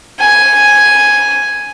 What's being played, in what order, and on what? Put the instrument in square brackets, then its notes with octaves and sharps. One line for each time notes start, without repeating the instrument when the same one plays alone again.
[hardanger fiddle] G#5